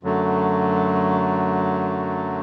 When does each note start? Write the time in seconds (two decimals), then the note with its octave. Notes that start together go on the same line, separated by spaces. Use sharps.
0.03 F#2 D3 F#3 A3